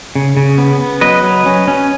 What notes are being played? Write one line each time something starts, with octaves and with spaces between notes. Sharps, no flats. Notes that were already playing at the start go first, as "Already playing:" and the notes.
C#3
C#3
B3
B3
F#3 B4 D#5
F#3
C#4
C#4